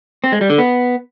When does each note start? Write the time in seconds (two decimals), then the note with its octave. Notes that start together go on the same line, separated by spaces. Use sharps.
0.24 C4
0.32 G#3
0.41 G3
0.50 D3
0.58 B3